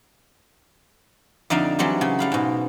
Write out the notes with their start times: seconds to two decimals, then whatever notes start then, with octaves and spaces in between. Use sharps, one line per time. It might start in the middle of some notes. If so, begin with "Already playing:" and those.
1.50 F2 D3 D#4 D5 E5 F5
1.79 E3 F#3 G3 C4 G4
2.01 C#3
2.19 G3 F5 B5
2.32 G#2 B2